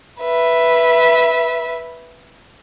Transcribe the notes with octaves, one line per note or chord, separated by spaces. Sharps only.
B4 E5